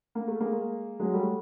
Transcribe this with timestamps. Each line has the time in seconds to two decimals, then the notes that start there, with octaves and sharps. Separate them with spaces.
0.15 A#3
0.28 A3
0.40 G#3 A#3
1.00 F#3 G#3
1.14 G3 A3